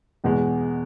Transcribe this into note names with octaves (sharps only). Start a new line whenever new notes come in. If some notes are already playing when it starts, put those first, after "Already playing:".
E2 B2 G#3